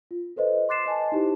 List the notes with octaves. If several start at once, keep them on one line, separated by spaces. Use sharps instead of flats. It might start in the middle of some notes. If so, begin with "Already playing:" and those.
F4
A4 B4 C5 D#5
C6 D6 F#6 A6 C7 E7
D#5 G#5 A5
D#4 E4 G4 C5